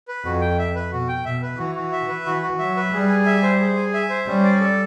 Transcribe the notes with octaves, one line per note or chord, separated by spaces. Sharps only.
B4
F2 F#4
G5
E5
B4
B2 F#4
G5
B2 E5
B4
E3 F#4
F#4
E5
B4
E3 F#4
F#4
F#3 E5
B4
G3 G#4
G#5
E5
C5
G#4
G#5
E5
C5
G3 C#4
D5
A4